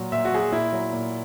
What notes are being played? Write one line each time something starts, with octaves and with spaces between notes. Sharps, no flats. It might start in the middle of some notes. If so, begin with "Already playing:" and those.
Already playing: A#2 F#3
A#2 E5
F#4
F#3 G#4
F#4
A#2 E4
F#3
A#2